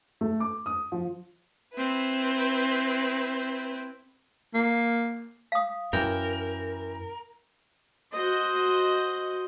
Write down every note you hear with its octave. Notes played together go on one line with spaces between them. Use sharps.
A3
D6
D#6
F3
C4 E4 B4
A#3
F5 D#6
F#2 E3 A#4 G5
F#4 C5 D#5